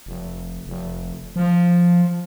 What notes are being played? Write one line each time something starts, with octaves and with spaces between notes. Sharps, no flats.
F1
F1
F3